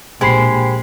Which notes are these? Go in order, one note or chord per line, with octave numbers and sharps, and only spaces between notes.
A#1 G#3 G4 C5 G#5 B5 C7